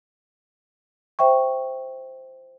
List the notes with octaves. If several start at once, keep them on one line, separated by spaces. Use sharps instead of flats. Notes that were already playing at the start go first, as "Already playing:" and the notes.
C5 E5 G5 C#6